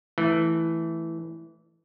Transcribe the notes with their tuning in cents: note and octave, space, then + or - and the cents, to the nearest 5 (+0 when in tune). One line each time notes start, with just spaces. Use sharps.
E3 +0 A3 +0